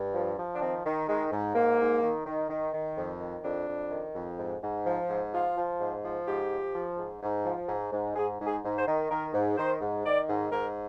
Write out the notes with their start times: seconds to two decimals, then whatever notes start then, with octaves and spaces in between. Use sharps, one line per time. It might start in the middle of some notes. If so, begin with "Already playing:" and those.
Already playing: G2
0.14 F3
0.37 F3
0.55 D4
0.61 D#3 C4
0.85 D#3
1.08 D#3 G#3
1.32 G#2
1.55 G#2 A#3
1.79 G#2
2.03 D#3
2.26 D#3
2.49 D#3
2.74 D#3
2.97 F2
3.20 D#3
3.44 F2 D4
3.68 F2
3.91 D#3
4.15 F2
4.38 G#2
4.62 G#2
4.86 F3
5.09 G#2
5.32 F3 F4
5.56 F3
5.80 G#2
6.04 F3
6.27 G#2 G4
6.51 F3
6.74 F3
6.98 G#2
7.22 G#2
7.45 F3
7.68 G#2
7.92 G#2
8.16 G#2 G#4
8.40 G#2
8.47 G#4
8.63 G#2
8.79 C5
8.87 D#3
9.10 D#3 A#4
9.34 G#2
9.58 D#3 C5
9.81 G#2
10.05 D#3 D5
10.28 G#2
10.52 G#2 A#4